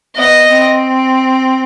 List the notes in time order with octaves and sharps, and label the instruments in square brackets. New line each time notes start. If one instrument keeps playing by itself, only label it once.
[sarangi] B3 [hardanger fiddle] D#5
[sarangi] C4